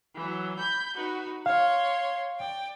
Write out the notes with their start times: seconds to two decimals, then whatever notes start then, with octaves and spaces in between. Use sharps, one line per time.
0.16 E3 F#3
0.58 B5 G6
0.96 D#4 F#4 B4
1.46 C#5 F5 C6
2.38 D5 G5